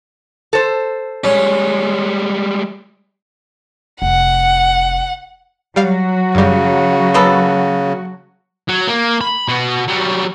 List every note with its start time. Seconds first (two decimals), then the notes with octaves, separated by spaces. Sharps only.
0.53 A4 C5
1.24 G3 G#3 C#4
4.02 F1 F#5
5.76 F#3 G3 F#4 F5
6.35 F#2 C#3 G3
7.14 A#3 B3 A4
8.68 F#3
8.88 A#3
9.21 B5
9.48 B2 F#4
9.88 F#3 G3